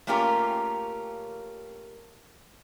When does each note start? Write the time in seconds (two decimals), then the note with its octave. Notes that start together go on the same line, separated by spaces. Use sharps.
0.07 A3 A#3 C#4 F4 G4 A#4